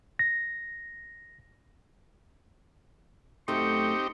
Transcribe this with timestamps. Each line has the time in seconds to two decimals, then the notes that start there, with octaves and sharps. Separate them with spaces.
0.19 A#6
3.48 F#2 A3 C4 D#4 G4 C#6